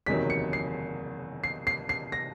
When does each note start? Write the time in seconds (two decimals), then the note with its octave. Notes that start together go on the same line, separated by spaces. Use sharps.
0.06 F#1 E2 C3 D#3 F#3 B6
0.30 C#7
0.53 C7
1.44 C7
1.67 C7
1.89 C7
2.12 A#6